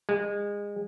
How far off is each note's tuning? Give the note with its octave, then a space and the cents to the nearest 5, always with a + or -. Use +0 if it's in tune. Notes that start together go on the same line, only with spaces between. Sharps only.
G#3 -25